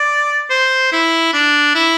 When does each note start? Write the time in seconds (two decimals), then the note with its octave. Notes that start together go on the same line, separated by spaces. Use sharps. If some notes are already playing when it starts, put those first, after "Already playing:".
Already playing: D5
0.50 C5
0.92 E4
1.33 D4
1.75 E4